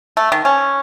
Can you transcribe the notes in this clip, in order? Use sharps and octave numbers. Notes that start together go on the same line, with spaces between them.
A3
D#3
C#4